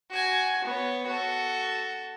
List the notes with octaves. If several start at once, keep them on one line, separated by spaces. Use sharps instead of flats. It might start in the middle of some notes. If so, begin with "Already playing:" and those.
F#4 G#5
B3 C#5
F#4 A4